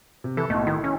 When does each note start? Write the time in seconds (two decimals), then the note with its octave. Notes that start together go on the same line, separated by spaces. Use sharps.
0.24 C3
0.37 E3 A4
0.50 B1 A2 A3
0.67 D#3 E4
0.84 C#4